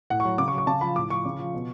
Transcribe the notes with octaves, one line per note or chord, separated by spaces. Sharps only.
A2 F#5
C#6
F#3
C#3 D6
C#6
F#3
C#6
C#3 A5
F3 B5
A2 D6
F3 C#6
C#3
F3
B2